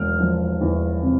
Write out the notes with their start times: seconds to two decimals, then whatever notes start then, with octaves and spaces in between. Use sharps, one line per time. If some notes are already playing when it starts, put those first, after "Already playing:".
Already playing: E1 F6
0.20 F3
0.61 E2
1.03 C3